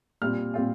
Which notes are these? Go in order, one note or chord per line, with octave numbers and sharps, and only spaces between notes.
A#2 G3 C4 F4 F6
A#2 G3 C4 F4